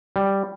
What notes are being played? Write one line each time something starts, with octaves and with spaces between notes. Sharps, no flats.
G3